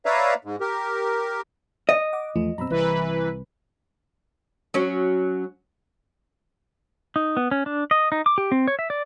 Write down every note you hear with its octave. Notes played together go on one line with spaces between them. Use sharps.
B4 C#5 D5 E5 F5 A#5
G#2
G4 A#4
D#5
F#5 D6
E2 F3 A3
F#2 B2 C4 A#5 B5 E6
C2 E3 B4
F#3 C#4
D#4
B3
C#4
D4
D#5
D#4
D6
G4
C4
C#5
E5
D5